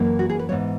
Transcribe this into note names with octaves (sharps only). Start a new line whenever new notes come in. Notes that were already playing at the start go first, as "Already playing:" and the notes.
Already playing: F#2 E3 A#3
F#4
G#4
B4
G#2 E3 B3 C#5